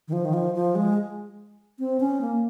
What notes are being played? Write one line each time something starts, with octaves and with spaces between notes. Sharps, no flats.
D#3
F3
D#3
F3
F3
G#3
C4
C#4
A#3